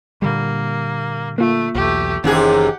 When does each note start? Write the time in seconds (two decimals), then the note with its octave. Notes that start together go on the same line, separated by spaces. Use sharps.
0.22 A#2 D3 G3 A#3
1.38 A3 A#3 F4
1.75 B1 E2 A3 G4
2.24 F#1 D#2 C3 E3 C#4 G4 G#4 F#5